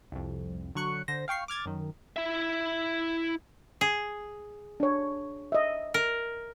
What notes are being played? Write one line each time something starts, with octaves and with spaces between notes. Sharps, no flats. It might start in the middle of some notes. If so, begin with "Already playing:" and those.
C2 F2
D3 F#3 C#6 F#6 C#7
D3 C5 A#6
F5 G5 C#6 C7
D6 F6 G#6 A6
F#2 D#3
E4 E5
G#4
D4 C#5
D#5 E5
A#4